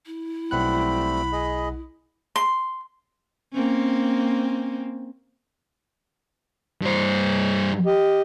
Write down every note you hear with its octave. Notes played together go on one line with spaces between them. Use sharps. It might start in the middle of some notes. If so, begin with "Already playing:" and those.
E4
B1 G3 A3 C4 F#5 B5 F#6
G#4 D#5
C6
A#3 C4 C#4
G2 C5
G4 D#5